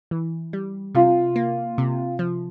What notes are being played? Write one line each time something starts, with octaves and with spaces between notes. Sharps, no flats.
E3
G3
C3 F4
A#3
C3
F3